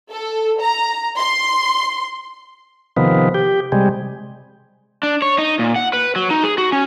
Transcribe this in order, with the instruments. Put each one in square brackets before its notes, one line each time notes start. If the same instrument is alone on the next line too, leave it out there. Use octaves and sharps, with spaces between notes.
[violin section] A4
A#5
C6
[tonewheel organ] C3 D#3 F3 B3
G4
C3 G3 G#3
[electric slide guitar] D4
C#5
D#4
A#2
F#5
B4
F#3
D#4
G#4
F#4
C#4